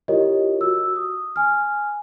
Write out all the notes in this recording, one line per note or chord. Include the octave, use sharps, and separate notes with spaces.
E4 F4 G4 A#4 C#5 D#5
F#4 E6
D#6
G#5 F6